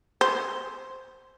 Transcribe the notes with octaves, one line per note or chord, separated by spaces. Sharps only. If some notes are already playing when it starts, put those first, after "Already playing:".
C5